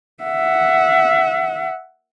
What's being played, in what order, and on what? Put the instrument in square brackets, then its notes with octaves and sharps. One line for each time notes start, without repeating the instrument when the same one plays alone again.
[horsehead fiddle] E5 F#5